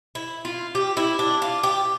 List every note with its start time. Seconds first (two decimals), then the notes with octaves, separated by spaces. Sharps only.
0.15 E4
0.45 F4
0.75 G4
0.97 E4
1.19 D4
1.42 F4
1.63 G4